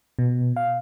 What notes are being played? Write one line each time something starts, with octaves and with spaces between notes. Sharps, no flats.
B2
F5